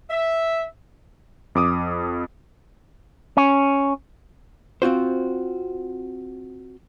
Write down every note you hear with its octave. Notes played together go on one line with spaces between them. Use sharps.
E5
F2 D6 D#6
C#4
C4 F4 F#4 C5